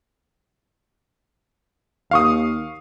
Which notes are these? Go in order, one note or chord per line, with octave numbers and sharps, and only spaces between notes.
D#2 F5 C#6 D#6